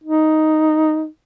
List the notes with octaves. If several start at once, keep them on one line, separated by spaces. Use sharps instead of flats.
D#4